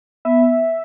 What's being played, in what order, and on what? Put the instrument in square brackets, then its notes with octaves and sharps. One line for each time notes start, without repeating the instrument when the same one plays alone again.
[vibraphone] B3 [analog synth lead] E5